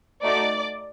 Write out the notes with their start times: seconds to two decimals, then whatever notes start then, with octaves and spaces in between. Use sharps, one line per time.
0.23 A3 D#4 F#4 D5 D6